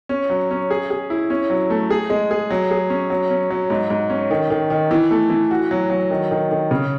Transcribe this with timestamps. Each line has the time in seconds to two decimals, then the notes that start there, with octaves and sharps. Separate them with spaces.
0.09 C#4
0.30 F#3
0.51 C#4
0.70 G#4
0.90 G#4
1.10 E4
1.30 C#4
1.50 F#3
1.70 A3
1.90 G#4
2.10 G#3
2.31 G#4
2.51 F#3
2.71 G#4
2.90 C#4
3.10 F#3
3.30 C#4
3.51 F#3
3.70 G#2
3.90 G#2
4.10 C#4
4.31 D#3
4.50 D#3
4.70 D#3
4.91 E3
5.11 A3
5.30 E3
5.51 F#4
5.71 F#3
5.90 F#3
6.11 D#3
6.31 D#3
6.51 D#3
6.71 C#3